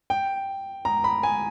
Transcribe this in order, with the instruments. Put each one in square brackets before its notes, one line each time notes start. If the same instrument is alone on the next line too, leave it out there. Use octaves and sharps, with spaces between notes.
[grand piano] G5
A#5
B5
G#5